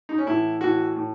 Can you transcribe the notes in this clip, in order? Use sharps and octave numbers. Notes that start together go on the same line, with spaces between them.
D#4
C#4
A2 E3 E4
A2 E3 F#4
A2